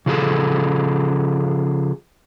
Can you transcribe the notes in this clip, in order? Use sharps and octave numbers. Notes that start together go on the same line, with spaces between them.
C#3 F3 G#4 A4